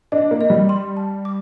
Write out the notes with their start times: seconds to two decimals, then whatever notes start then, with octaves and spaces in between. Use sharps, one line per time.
0.12 D4 D#5
0.31 A#3
0.41 D#5
0.50 G3
0.69 C6
0.97 A5
1.25 D6